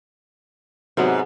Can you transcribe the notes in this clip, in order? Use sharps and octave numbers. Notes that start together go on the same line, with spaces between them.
G#2 C3 F#3 B3